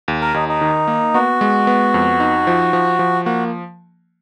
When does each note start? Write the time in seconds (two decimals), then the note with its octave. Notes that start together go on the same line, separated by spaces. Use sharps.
0.08 D#2
0.21 A#4
0.34 D#2 D#4
0.49 D#4
0.61 D#3
0.88 A#3
1.14 B3 F#4
1.41 G#3
1.67 B3
1.94 F2
2.20 D#4
2.47 F3
2.73 F3
2.99 F3
3.25 A#3 F#4